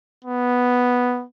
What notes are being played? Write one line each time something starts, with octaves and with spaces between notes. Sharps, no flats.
B3